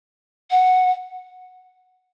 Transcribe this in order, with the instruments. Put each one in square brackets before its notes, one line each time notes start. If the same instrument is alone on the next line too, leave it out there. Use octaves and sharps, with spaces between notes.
[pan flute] F#5